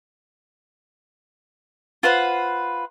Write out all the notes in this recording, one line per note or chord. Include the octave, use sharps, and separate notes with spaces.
F4 B4 C5 F#5